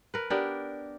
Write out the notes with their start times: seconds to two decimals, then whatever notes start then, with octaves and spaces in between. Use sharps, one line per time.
0.14 A#4 B4
0.30 B3 D4 G4 A#4